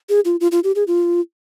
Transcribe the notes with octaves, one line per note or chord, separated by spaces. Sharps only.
G#4
F4
F4
F4
G4
G#4
F4